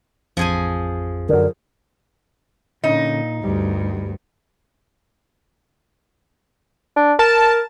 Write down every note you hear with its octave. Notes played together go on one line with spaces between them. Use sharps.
A1 F2 F3 G#4 G#5
F#2 D3 A#4
A#2 D3 C#4 D#4
D2 G2 G3
D4
A#4 A5